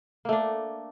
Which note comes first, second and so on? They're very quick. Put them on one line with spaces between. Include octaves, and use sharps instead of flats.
A#3 A3 D4